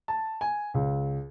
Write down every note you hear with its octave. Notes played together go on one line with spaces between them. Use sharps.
A5
G#5
C#2